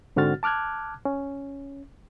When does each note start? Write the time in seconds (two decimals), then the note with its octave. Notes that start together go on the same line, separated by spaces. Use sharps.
0.16 G#2 D3 C4 F#4 F6 A6
0.43 A5 D6 F6 F#6 G#6
1.05 C#4